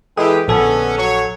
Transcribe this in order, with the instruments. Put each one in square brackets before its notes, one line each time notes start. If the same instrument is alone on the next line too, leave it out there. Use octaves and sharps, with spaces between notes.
[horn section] E3 G#3 G4 [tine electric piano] A4 G5 D#6
[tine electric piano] A#1 A4 G#5 [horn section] D3 B3 C#4
[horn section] F#3 C#5